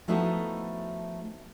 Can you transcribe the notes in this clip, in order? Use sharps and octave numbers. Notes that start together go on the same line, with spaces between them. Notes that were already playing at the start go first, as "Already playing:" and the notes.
F3 A3 B3 D#4 E4 F#4